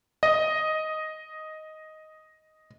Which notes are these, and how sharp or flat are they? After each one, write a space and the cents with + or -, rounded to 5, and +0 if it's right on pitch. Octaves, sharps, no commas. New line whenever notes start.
D#5 +5